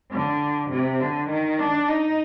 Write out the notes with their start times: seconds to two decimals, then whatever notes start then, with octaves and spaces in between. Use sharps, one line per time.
0.11 D3
0.71 C3
1.00 D3
1.30 D#3
1.59 D4
1.88 D#4